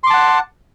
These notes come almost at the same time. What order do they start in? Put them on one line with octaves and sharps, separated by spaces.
C6 D6 A5 F#5